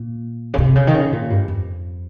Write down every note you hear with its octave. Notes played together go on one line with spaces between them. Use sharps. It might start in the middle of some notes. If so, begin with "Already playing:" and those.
Already playing: A#2
C#3
C3
C#3
D#3
C#3
A#2
G2
F2